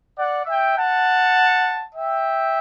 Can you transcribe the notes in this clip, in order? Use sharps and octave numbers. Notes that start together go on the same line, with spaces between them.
D5 F#5
E5 G5
F#5 A5
E5 G5